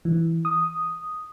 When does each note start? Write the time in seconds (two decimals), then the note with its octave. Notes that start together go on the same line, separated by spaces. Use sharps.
0.05 E3
0.45 D#6